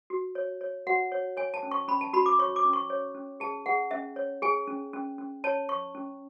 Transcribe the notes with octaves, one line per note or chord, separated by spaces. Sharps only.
F#4
C#5
C#5
F#4 F#5
C#5
C#5 G#5
A5
C#4
C#6
C#4 B5
A5
F#4 B5
D6
C#5 C#6
D6
C#4
C#6
C#5
C#4
G#4 A5
G#4 F#5
C#4 E5
C#5
G#4 G#5
C#4
C#4
C#4
C#5 A5
C#5 C#6
C#4